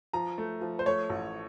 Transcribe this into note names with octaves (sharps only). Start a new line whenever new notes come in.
F3 A#5
A3
F3
C5
A3 C#5
A1